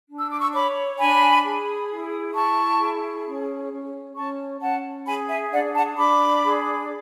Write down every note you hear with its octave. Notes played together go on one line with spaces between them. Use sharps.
D4
E6
D6
C#6 E6
C#5 B5 D6
D4 G#5 B5
G#4
E4
E4 A5 C#6
G#4
C#4
C#4
C#4 A5 C#6
C#4 F#5 A5
G#4 G#5 B5
E5 G#5
D4 D5 F#5
F#5 A5
D4 B5 D6
G#4